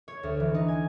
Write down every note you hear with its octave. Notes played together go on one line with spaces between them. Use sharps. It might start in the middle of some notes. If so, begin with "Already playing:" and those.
C#5
D2
E3
D#4
G#5